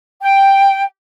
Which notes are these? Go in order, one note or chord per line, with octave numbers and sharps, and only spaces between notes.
G5